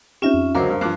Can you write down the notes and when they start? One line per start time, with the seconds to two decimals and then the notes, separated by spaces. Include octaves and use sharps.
0.22 C4 C#4 D#4 F4 G4 E5
0.34 F2
0.55 C#2 D3 F#3 A#4 C5 F5 A#5 D6
0.70 G2
0.81 G2 F3 D6 F#6 C7